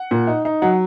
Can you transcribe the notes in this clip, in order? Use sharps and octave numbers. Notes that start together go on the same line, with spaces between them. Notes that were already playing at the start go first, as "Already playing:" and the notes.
Already playing: F#5
A#2
D#4
D#4
F#3 F#5